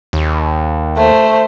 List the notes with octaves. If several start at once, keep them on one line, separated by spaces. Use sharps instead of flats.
D#2
A3 C5